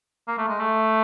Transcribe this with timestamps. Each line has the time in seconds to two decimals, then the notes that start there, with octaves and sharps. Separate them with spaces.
0.27 A#3
0.38 A3
0.48 G#3
0.60 A3